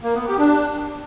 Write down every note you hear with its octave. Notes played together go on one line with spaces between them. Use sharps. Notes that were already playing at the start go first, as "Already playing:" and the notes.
A#3
B3
G4
D4